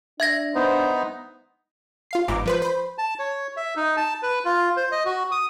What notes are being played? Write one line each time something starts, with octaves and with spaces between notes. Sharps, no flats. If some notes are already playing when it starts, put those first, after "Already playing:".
D4 E5 G#6 A#6
B3 D#4 C5
F4 F5 C7
G1 G#2 E3 A#5 D6
F3 B4 C5
C5 B5
A5
C#5
E5
D#4
A5
B4
F4
C5
D#5
F#4
D#6